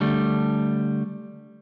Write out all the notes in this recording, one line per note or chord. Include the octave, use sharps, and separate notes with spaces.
D3 G3 A3